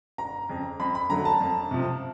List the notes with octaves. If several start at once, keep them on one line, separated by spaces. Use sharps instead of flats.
G1 A#5
F2 C#3
F2 B5
B5
D3 F#3 A3 A#5
A5
F2
C3 F3